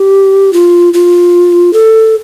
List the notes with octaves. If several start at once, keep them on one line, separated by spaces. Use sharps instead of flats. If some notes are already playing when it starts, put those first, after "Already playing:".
Already playing: G4
F4
F4
A4